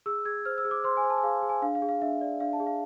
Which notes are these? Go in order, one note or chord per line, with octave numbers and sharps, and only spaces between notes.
G#4 E6
G#4 G#6
C5 F6
E6
G#4
D6
C5 C6
G#5
C5
A5
G#5
G#4 F5
G#4
G#5
D4 F5
F5
G#4
F5
D4 E5
D5
D4 F5
A5
G#4
F5